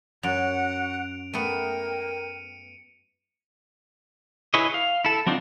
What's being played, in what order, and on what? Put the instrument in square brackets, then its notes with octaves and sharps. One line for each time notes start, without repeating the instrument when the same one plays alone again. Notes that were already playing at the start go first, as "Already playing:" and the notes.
[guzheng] F#2 [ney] F#4 [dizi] F#5 [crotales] D7 F7
[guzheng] A3 B3 [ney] A#4 [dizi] G5 [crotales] C#7 D#7
[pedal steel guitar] E4 G#4 B4 C#5 D#5
F5
E4 A4
F#3 C4 D4 D#4 F4